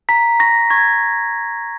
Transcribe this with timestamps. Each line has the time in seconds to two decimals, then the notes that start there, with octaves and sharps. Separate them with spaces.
0.09 A#5 B6
0.40 C#6 A#6
0.70 C#6 G#6